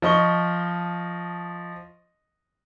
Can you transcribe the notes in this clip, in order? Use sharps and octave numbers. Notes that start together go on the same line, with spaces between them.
F3 D#5 C#6 G7